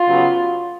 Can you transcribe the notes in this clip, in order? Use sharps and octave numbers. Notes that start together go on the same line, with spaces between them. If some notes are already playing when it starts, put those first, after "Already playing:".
Already playing: F4
C#3 F#3 B3